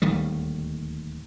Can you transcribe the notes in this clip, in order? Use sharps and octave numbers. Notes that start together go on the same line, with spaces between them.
D1 D#2 D#3 G3